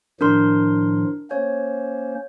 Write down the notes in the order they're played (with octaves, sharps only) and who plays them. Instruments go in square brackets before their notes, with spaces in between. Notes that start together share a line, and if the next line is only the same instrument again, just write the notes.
[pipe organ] A2 D#3 F3 [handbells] D4 A#4 C6
[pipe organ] A#3 C#4 C5 [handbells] C#5